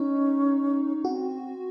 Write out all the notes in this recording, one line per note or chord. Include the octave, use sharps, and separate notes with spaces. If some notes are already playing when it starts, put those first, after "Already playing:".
Already playing: C#4 D#4
C4 F#4